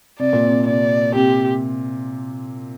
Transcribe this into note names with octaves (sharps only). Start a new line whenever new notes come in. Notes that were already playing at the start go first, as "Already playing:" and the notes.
C3 D5
A#2
C3
C3 D5
C3 G4